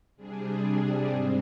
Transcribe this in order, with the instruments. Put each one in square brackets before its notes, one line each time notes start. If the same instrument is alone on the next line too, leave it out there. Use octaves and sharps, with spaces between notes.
[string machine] C3 G3 D4 G#4
G#2 G3 C4